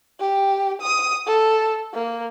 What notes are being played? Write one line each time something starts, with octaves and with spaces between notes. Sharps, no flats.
G4
D#6
A4
A#3